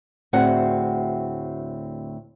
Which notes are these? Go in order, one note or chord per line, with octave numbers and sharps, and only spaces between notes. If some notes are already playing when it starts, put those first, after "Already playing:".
D2 A2 C4 F#4 G#4 F#5